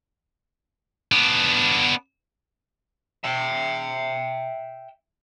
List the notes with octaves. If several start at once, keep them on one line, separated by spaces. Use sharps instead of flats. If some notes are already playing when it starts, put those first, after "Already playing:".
B3 D4
E5 G5